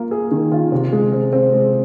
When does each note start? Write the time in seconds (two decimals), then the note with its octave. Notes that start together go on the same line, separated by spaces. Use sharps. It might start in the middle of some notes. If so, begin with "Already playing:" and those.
Already playing: A#3 F4
0.11 G#4
0.31 D#3
0.52 F4
0.72 C3
0.92 G#3
1.12 C4
1.33 C4
1.54 G#3